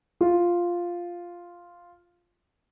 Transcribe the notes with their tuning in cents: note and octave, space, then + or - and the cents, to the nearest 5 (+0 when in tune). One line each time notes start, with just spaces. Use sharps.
F4 +0